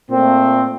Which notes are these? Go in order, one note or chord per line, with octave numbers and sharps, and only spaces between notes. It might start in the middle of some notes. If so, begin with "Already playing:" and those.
A#2 A3 C4